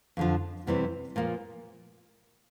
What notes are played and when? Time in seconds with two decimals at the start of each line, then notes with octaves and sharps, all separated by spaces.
0.17 F2 D3 F3
0.67 E2 C3 E3 G3 C4
1.16 A#2 F3 A#3